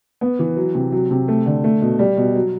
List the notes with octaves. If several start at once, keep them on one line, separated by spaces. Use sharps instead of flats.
B3
E3
F#3
C3
F#3
C3
A3
D3
A3
B2
G3
B2
F#3